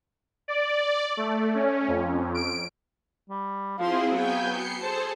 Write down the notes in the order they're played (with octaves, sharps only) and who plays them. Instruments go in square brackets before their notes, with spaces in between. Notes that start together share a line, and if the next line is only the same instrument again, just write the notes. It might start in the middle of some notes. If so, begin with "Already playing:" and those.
[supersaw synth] D5
A3
C#4
F2
D7
[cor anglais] G3
[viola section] F3 C5 C6 [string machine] C4 E4 G#4 [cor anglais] F5
[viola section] F#3 B3 [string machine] G5 G#5 G6
[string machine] C7 C#7
[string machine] G#4 A4 [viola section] C5 A5